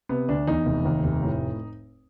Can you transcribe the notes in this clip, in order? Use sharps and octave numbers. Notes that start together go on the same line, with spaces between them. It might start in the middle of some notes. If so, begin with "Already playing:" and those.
C3 B3
D2 D4
E2 D#4
F1
D#2
F1
A2